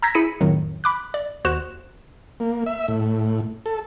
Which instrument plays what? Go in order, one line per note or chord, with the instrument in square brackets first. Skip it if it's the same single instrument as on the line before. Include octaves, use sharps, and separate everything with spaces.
[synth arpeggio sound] A#5 E6 G6 G#6 A#6 B6
E4 G#4 B5 B6 C#7 D#7
F2 A2 D#3 F#3
B5 D6 F#6
D5
D#2 F#4 C5 F#6 E7
[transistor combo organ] A#3
E5
A2
A4